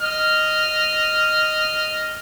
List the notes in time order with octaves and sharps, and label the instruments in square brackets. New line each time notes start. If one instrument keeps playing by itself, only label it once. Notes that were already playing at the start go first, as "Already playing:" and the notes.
[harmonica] D#5 F6